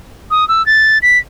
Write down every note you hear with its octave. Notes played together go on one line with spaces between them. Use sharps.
D#6
E6
A6
B6